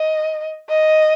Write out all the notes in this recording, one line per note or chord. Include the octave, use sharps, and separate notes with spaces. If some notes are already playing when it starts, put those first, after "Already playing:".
Already playing: D#5
D#5